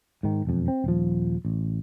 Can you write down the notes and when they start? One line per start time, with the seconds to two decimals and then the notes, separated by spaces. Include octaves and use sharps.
0.23 G#2 D#3
0.45 E1 F2
0.68 C4
0.84 D#1 F3
1.45 A1